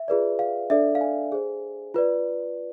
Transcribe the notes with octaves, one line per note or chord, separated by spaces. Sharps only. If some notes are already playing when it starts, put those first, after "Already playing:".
Already playing: E5
F4 G#4 B4 D5
F5
D4 A4 D5 E5
F5
G#5
G#4 C5
F4 B4 D5